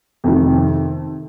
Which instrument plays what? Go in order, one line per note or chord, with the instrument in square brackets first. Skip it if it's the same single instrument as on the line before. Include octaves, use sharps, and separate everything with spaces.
[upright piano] F2 C3 D#3